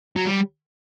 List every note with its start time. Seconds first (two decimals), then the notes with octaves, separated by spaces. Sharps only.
0.16 F#3
0.26 G3